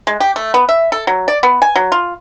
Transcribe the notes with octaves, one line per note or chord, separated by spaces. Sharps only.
G#3
G4
A3
B3
E5
A4
F#3
D5
B3
G#5
F#3
F4